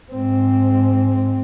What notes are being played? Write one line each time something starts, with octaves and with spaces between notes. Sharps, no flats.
G#2 C4